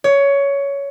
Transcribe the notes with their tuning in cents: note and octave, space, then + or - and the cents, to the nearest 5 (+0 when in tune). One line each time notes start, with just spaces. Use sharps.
C#5 +15